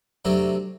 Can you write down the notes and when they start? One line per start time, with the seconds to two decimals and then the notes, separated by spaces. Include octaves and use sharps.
0.25 C3 F#3 A3 D4 F#4